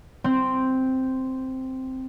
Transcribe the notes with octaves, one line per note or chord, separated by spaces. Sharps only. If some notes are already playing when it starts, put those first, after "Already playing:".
C4